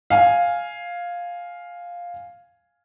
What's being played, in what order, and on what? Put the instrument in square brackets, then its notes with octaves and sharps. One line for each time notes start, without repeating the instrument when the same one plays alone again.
[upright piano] F5 G#5